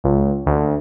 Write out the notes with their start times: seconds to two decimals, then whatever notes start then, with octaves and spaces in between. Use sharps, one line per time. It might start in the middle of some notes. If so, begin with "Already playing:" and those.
0.04 C#2
0.46 D2